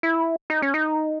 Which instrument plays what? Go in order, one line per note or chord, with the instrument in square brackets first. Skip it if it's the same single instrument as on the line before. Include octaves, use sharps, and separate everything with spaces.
[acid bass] E4
D#4
C#4
D#4